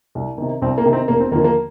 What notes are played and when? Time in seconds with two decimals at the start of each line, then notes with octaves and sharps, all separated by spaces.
0.15 C2
0.38 C3 D#3
0.62 C2 C4
0.78 A#3
0.85 C3 D#3
0.93 C4
1.08 F1 A#3
1.20 C4
1.32 D#2 D3 F3 A#3
1.44 A#3